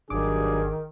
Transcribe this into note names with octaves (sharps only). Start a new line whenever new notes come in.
G#1 G2 D#3 F#3 D4 G#4 D6